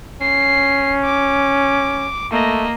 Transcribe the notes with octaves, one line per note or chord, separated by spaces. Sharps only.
C#4 C7
D6
A3 A#3 D#5